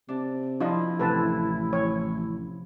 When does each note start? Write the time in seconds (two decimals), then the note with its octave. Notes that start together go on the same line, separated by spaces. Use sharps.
0.09 C3 D4
0.60 F3 D4 E4 F4 D#5
0.99 A1 C3 A4 B4 A5
1.73 C#5